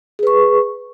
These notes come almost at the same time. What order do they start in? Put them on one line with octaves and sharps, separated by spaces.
G#4 B4 C#6